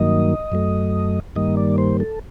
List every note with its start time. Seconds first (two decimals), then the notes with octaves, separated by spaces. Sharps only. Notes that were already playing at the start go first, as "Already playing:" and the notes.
Already playing: G2 D#3 F#3 A#3 D#5
0.52 F#2 F#3 A3
1.36 G2 D#3 G3 A#3 D#5
1.57 D5
1.78 C5
2.00 A4